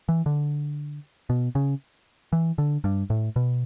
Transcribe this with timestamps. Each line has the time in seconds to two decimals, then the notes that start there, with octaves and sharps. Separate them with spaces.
0.09 E3
0.26 D3
1.30 B2
1.55 C#3
2.33 E3
2.58 D3
2.84 G2
3.10 A2
3.36 B2